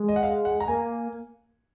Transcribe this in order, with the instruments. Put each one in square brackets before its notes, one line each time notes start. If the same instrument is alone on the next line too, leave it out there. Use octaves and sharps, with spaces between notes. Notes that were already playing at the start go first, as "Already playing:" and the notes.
Already playing: [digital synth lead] G#3
[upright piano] D#5
F#5
F5
F#5
A#5
[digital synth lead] A#3 [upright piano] G#5